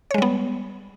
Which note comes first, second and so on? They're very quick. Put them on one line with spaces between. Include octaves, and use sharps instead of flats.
C#5 G#3 G3 B3